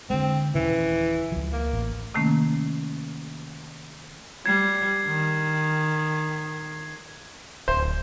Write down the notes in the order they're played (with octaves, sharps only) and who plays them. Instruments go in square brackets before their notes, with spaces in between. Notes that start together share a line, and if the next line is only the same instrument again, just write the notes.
[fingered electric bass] D3 G#3 [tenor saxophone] C4
[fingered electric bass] D#1 C#3 [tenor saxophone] E3
[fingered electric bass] C#2 F3
[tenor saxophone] A#3
[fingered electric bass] A1
[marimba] C3 D#3 A3 A#3 C#4
[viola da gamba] G3 [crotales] G#6 C7
[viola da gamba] D#3
[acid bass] D1 [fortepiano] C5